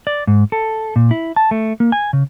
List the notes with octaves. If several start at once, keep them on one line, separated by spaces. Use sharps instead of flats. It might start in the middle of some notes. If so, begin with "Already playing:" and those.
D5
G#2
A4
A#2
E4
A5
A3
A#3
G#5
C#3